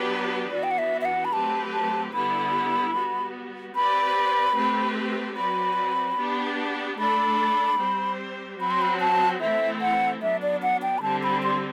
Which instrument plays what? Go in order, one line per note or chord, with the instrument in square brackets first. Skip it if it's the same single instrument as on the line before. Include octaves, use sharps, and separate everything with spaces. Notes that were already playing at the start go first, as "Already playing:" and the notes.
Already playing: [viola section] F#3 B3 D4 G4 B4
[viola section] E3 B3 D4 F#4 [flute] D5
[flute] G5
F#5
E5
E5
F#5
B5
[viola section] F#3 A3 C4 G4 B4 [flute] A5
[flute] A5
[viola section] D3 G3 B3 E4 [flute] B5
[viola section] G3 B3 F#4
[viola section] C4 G4 B4 D5 [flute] B5
[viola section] A3 C4 G4 B4
[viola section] F#3 C4 F#4 B4 D5 [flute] B5
[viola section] B3 D4 G4
[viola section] A3 D4 A4 D5 [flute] B5
[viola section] G3 C4 G4 C5
[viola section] F#3 C4 F#4 [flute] B5
[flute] C6
B5
A5
[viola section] E3 A3 C4 E4 A4 [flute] E5
[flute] F#5
[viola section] F#3 B3 D4 [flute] E5
[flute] D5
F#5
G5
B5
[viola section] D3 G3 C4 [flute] A5
[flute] B5
C6